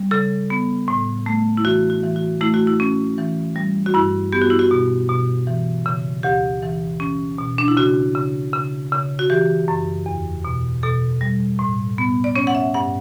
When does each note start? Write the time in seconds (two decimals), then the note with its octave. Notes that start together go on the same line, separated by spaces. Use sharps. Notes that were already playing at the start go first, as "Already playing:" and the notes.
Already playing: G3
0.11 C#3 A4
0.50 B3
0.88 A2
1.26 A3
1.57 E4
1.64 E3 F#4
1.90 F#4
2.03 E3
2.16 F#4
2.41 A3 E4
2.54 F#4
2.67 E4
2.80 C#4
3.18 E3
3.56 G3
3.86 F#4
3.94 G2 E4
4.32 B3 G4
4.42 F#4
4.50 E4
4.59 F#4
4.71 B2
5.09 B2
5.47 E3
5.86 C#3
6.23 D2 G4
6.63 E3
7.00 C#4
7.38 B2
7.58 D4
7.68 E4
7.77 C#3 F#4
8.15 C#3
8.53 C#3
8.92 C#3
9.19 F#4
9.30 E3 G4
9.68 F#2
10.06 E2
10.45 B2
10.83 B2 A4
11.21 G3
11.59 A2
11.98 B3
12.24 D5
12.36 C#4 C#5
12.47 F#5
12.55 E5
12.74 G2 F#5